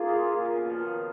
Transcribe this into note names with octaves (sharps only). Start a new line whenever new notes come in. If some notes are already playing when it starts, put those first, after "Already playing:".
Already playing: A#3 F4 G#4
C#3
A#2
C#3
B2
F3
D#3